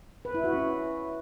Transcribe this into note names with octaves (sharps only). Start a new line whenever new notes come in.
B4
E4
F#4
C#4